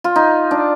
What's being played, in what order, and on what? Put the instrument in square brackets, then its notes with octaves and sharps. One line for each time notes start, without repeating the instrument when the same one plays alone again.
[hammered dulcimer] F4
D#4
D4